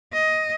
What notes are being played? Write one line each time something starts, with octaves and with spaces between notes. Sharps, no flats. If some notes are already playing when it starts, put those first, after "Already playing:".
D#5